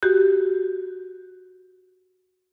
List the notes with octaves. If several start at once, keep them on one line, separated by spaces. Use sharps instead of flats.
F#4 G4